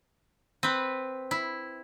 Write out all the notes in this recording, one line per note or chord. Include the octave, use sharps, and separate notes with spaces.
C4 B4
E4